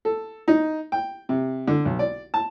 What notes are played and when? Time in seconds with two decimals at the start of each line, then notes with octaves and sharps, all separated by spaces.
0.05 A4
0.48 D#4
0.92 G5
1.29 C3
1.68 D3
1.85 B1
1.99 D5
2.34 A5